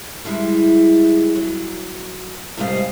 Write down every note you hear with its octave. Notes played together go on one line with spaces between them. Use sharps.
G3 G#3 E4
F#3
G#2 C3 G3 D#5 F5